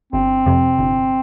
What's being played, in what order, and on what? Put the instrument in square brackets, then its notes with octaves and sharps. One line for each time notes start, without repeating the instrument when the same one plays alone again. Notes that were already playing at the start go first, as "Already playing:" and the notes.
[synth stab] G1 [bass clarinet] C4
[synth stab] F2 C3
G1